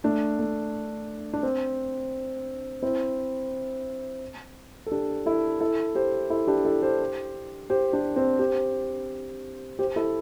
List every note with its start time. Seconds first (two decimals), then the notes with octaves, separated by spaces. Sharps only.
0.04 A3 D4
0.39 A3
1.33 D4
1.43 C4
2.82 C4 E4
4.86 A4
4.92 D4 G4
5.26 E4 A4
5.60 E4 A4
5.95 G4 C5
6.30 E4 A4
6.47 D4 G4
6.65 E4 A4
6.82 G4 C5
7.70 G4 C5
7.93 D4 G4
8.16 C4
8.39 G4 C5
9.79 G4 C5
9.96 E4 A4